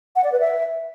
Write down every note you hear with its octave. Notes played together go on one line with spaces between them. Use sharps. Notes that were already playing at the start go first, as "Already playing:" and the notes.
F#5
D5
B4
E5